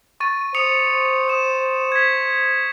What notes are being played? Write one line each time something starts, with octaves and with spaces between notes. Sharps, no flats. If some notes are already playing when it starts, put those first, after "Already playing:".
C#6 A6 D#7
C5 D#6 C#7 F7
D#6 E7
G#6 B6